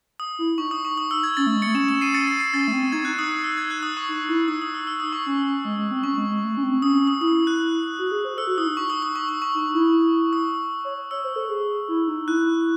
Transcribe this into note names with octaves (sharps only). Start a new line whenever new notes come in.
D#6
E4
D#4 C#6
D#6
C#6
D#6
E6
G#6
C#4 A6
A3
G#3
A6 C#7
A3
C#4 C#7 E7
C#7 E7
C7 D#7
A6 C#7
C7 D#7
C7
C#4 A6
A3
C4
D#4 G#6
F#6
D#4
D#6
D#6
E6
G#6
F#6
D#6
C#6
D#4
E4
D#4 D#6
D#6
E6
E6
D#6
C#6
C#4
G#3
G#3
C4
C#4 C#6
G#3
G#3
A3
C#4
C4
C#4 D#6
D#6
E4 D#6
F#6
F#4
G#4
C5
A4 E6
F#4
E4 D#6
D#4
C#6
D#6
D#6
C#6
D#6
C#6
D#4
E4
D#6
C#5
C#5 E6
C5
A4
G#4
E4
D#4
E4 F#6